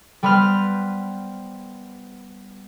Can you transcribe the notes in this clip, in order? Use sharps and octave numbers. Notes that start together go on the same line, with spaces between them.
G3 B3 B4 C5 F6